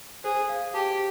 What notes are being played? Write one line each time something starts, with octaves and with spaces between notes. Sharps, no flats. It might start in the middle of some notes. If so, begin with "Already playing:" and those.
G#4 C5
F5
G4 A5